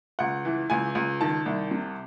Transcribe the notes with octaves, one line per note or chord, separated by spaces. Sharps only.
C#2 F#5
E3
C#2 G#5
C#2
D#3 A5
C2
C3